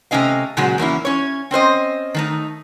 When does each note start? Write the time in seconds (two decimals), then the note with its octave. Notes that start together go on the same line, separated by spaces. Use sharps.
0.11 C3 A3 C#4 D#5 F5
0.57 A#2 C#3 F#3 G#3 F#4
0.78 E2 A#3 C#4 E4
1.05 C#4 C#5
1.51 C4 C#4 C5 D#5
2.14 D#3 A3 D#4